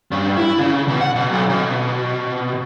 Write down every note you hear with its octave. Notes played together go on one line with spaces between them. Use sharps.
G2
E4
C#3
B2
F#5
B2
B1
B2